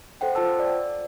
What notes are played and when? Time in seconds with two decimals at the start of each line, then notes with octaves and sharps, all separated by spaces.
0.21 A4 C5 F#5 G5
0.35 F4 C5 A5 E6
0.59 D5